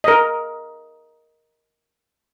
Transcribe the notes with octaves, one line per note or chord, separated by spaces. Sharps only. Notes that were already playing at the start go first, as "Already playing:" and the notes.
A#4 D#5